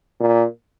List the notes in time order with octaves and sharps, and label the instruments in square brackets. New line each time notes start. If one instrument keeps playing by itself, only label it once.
[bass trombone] A#2